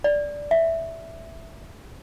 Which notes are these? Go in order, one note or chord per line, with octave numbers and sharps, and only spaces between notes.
D5
E5